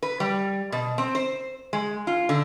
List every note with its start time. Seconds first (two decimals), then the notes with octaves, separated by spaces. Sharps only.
0.03 B4
0.20 G3
0.72 B2
0.98 C4
1.15 C5
1.73 G#3
2.07 F4
2.29 D3